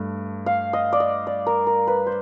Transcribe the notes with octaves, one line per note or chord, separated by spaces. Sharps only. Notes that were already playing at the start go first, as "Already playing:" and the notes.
Already playing: G2 A3
F5
D#5
D5
D#5
D5
A#4
A#4
B4
C5